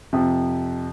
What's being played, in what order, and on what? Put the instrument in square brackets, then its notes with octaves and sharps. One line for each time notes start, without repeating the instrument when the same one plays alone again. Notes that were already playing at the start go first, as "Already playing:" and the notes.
[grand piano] F2 C3 F3